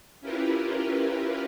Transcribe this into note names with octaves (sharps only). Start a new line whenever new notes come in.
C#4 E4 F4 G4 A#4 B4